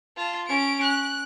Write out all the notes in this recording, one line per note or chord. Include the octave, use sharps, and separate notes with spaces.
F4 A5
C#4 D7
F#6